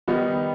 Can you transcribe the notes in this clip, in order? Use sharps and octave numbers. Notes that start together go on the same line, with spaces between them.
D#3 G3 B3 D#4